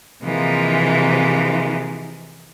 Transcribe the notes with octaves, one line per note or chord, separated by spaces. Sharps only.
C3 E3 F3 G#3 A#3